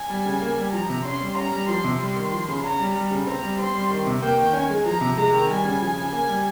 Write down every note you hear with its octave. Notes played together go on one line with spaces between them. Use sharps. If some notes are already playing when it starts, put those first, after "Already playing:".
Already playing: G#5
G3
C#3
A#3
G3
F3 A#5
C3
C#4 C6
G3
C#4 A#5
G3
F3 C6
C3
G3 C6
D#3
F3
C#3
C#4 A#5
G3
G3
C#3
C4 A#5
G3
C4 C6
G3
D#3
C3
A#3 G5
D#3
C#4 G#5
G#3
F3 A#5
C3
G#3 A#5
D#3
G3 G#5
C#3
F3
C#3
A#3 G#5
G3